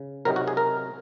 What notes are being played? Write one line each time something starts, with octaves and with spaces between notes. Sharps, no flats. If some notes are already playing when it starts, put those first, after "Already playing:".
Already playing: C#3
C3 F#3 C4 D#4 A#4
F#4
G#4
A#4